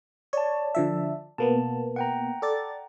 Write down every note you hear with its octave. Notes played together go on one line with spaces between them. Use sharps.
C#5 D5 A5
D3 F3 E5
B2 A#3 B3 A5
F#5 G5 A#5
A4 D5 A6